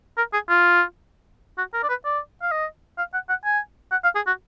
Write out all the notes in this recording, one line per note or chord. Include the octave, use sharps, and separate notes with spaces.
A#4
G#4
F4
F#4
A#4
D5
B4
D5
F5
D#5
F5
F#5
F#5
G#5
F#5
F5
G#4
F#4